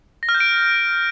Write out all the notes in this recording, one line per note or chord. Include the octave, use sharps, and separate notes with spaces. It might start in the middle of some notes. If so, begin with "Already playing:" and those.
A#6
F6
G6
D7